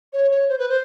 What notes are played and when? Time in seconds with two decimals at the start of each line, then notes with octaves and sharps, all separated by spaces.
0.13 C#5
0.31 C#5
0.49 C5
0.58 B4
0.69 C5